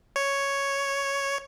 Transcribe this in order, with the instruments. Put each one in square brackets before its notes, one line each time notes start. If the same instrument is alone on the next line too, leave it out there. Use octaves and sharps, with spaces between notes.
[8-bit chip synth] C#5